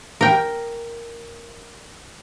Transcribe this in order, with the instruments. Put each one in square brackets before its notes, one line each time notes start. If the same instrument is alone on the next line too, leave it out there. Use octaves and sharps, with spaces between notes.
[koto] A#4 G5